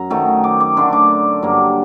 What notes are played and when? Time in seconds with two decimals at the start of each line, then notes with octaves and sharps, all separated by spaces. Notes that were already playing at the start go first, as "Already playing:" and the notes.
Already playing: F#2 A#5
0.10 D#3 F#3 A3
0.44 D6
0.60 D6
0.77 D3 A3 D4 C6
0.93 D6
1.43 G2 F#3 A#3